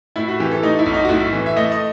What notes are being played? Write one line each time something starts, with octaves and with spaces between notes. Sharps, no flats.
A2 E4
F#4
E3 G4
A4
A3 D#4
E4
B1
D#4
F#4
A2 E4
E3
E5
A3 D#5
D#5